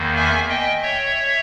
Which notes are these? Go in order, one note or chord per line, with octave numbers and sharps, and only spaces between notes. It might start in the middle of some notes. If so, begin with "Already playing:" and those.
Already playing: E2 D#3 A#3
E5 G#5
D#5 G5
C#5 E5